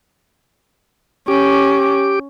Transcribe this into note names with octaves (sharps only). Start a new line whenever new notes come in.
C#4 G4 D6